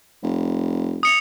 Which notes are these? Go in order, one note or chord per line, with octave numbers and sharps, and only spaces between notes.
F1
D#6 C#7 F7